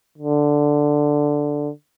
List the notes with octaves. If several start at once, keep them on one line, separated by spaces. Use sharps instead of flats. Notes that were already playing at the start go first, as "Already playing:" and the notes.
D3